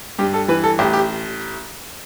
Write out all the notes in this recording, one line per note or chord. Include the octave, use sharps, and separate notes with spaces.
G2 G4
A4
E3 B4
A4
A1 G4
G4